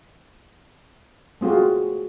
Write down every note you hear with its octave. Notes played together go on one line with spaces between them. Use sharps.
A3 C4 F4 F#4 G#4